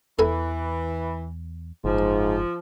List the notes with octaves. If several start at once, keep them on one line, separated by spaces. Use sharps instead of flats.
E2 E3 A4 B4 G#5
F#1 G#2 F3